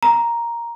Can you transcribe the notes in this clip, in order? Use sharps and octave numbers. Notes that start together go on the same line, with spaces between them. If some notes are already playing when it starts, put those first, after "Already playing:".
A#5